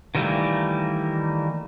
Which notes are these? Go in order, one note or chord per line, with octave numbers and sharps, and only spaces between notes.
D#3 E3 G3 A3 A#3